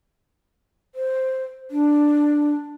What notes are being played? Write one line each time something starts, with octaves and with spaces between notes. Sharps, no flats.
C5
D4